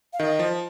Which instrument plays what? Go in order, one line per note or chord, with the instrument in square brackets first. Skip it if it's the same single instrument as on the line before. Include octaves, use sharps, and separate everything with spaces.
[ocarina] F5
[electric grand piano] D#3 [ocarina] D#5
[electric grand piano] F3